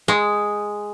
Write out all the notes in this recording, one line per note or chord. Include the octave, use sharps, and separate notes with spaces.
G#3